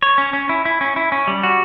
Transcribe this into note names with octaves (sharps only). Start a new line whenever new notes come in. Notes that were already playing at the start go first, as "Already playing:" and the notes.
C#5
C#4
C#4
E4
E4
C#4
E4
C#4
G3
F#4